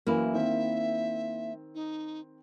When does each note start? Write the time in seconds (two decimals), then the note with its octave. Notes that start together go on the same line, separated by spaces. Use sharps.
0.07 F#2 E3 A#3 E4
0.34 D#3 C4 E5
1.75 D#4